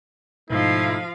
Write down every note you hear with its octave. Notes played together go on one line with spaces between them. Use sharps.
G#2 B2 F3 A3 D#4 E4 F5